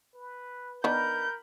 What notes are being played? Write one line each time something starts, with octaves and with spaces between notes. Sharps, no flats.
B4
D#3 B3 D4 A#4 B5 G6